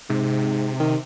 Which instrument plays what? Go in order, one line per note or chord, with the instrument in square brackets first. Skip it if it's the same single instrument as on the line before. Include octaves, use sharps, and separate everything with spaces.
[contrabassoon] G#2 [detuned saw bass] C3
[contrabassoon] D#3